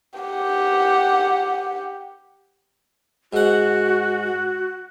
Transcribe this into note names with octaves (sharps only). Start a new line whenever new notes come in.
G4 F#5
G#2 F#4 F#5